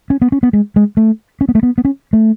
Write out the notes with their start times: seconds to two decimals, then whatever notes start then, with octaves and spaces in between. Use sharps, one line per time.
0.10 C#4
0.22 B3
0.32 C#4
0.43 B3
0.53 G#3
0.76 G#3
0.97 A3
1.41 C#4
1.49 B3
1.55 A3
1.63 B3
1.78 B3
1.85 C#4
2.13 A3